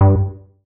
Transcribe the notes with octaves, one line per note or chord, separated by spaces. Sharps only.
G2